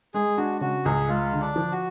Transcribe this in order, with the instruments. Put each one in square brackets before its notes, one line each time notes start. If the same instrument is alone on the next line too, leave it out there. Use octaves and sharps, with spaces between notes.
[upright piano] G#3 [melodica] G#4
[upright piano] D4 [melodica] F#4
[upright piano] C#3 [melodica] F#4
[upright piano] C#2 [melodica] G#4
[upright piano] G#3 [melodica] F4
[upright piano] D3
[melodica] D4
[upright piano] F3
[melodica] F#4